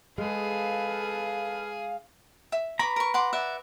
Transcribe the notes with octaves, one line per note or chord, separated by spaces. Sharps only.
G#3 G#4 A4 B4 F5
E5
B4 A#5 B5 C#6 D6
A#4 C#6
F#5 C6 D6
D5 E5 F#5